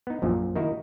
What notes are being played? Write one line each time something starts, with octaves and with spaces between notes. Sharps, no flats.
B3 D#4
A#1 F#2 A#2 F3
D#3 A#3 D#4 E4 F#4 A#4